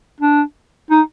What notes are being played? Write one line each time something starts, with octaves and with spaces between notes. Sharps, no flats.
D4
D#4